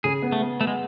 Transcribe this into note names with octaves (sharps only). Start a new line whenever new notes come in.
C#3 G#4
B3
A3
B3
A3 B3
G#3